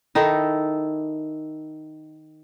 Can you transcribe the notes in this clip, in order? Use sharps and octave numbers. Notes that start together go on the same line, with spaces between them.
D#3 D#4 E4 A4